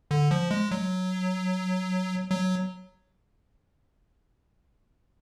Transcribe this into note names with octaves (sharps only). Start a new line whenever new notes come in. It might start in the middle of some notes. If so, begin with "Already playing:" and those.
D3
F3
G#3
F#3
F#3